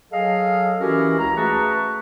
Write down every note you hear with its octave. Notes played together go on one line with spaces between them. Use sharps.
F#3 G#4 A4 D#5 F5
E3 C#4 E4 F#4 G4 A#4
C#2 A#5
A3 F#4 G#4 B4 A5 C#6